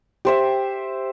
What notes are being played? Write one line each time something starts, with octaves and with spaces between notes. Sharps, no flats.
G4 C5 E5